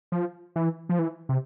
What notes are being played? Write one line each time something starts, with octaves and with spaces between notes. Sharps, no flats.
F3
E3
F3
E3
C3